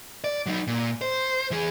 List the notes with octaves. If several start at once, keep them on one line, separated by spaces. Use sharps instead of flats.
D5
F#3 D#4
A#2
C5
E3 G#4